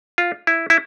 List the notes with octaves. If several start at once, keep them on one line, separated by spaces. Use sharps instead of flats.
F4
E4
E4